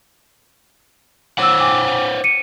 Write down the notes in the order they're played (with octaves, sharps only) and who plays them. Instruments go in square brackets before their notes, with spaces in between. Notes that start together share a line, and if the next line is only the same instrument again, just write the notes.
[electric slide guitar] C5 C#5 F#5 [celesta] D6 E6
[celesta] G5 G#5 D6
C#7 D#7